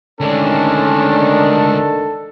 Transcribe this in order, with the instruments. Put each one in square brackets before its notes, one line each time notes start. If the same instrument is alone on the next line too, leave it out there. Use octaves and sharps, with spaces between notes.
[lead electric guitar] D2 G#3 [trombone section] D#3 D4 [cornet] C#4 [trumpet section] A4